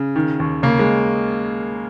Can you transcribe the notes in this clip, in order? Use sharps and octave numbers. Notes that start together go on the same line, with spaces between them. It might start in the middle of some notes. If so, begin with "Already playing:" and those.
Already playing: C#3
D#3
D#2
C#3 A#3
G#3